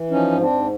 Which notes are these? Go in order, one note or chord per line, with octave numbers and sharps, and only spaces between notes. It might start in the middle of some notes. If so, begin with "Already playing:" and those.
Already playing: E3
F3 C#4 D#4
G#2
C4 D4
G#2